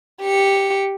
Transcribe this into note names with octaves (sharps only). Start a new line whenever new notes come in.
G4 C#7